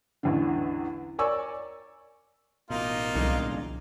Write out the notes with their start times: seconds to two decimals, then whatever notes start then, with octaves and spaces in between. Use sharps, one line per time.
0.23 A1 E2 D3
1.19 A#4 C#5 D5 G#5 C#6 E6
2.70 A1 B2 A#3 D#4 F4
3.15 C2 F2 D3 G#3